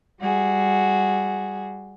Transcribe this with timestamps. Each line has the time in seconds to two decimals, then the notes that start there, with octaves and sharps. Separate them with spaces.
0.20 G3 F#4 G#4